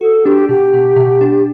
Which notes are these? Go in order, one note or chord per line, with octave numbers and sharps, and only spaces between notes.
F#4 A4
D4 G4
B2 G4
B2
B2
D4